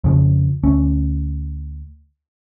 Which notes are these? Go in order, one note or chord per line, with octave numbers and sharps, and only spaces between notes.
F2 C#3 F3
D2 C#4